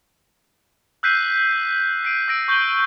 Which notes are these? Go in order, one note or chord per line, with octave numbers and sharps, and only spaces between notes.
E6 F#6 G6 B6 C7 D#7
C7
C7 D7 D#7
E6 A#6 D7
C#6 G6 F#7 G7